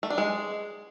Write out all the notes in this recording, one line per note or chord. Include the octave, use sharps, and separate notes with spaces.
A3
D4
G#3